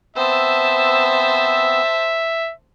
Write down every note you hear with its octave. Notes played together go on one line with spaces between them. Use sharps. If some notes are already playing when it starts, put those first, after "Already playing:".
B3 C4 C5 E5 A5 E6